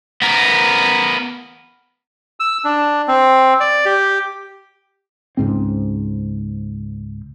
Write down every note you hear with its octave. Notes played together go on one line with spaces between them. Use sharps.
B3 A#4
E6
D4
C4
D5
G4
C#2 G#2 C4